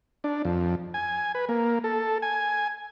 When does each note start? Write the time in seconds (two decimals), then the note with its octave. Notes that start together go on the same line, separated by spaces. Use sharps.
0.24 D4
0.45 F2
0.94 G#5
1.35 B4
1.49 A#3
1.84 A4
2.22 G#5